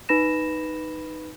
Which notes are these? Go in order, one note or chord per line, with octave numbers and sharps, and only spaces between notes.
D#4 B4 B5 A#6 E7